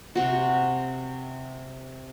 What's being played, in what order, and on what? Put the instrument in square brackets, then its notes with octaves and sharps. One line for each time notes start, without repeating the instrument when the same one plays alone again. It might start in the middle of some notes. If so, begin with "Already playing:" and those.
[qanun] C3 F#4